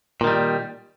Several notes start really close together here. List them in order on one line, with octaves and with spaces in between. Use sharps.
A#2 D#3 G3